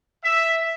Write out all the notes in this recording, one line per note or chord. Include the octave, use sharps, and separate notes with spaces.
E5